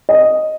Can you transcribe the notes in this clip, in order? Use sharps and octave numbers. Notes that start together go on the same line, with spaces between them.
D#5